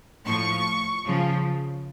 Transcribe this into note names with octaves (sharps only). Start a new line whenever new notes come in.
A2 F3 C#6
C#3 F3